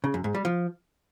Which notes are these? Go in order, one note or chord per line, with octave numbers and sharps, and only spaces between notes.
C#3
F#2
G#2
G3
F3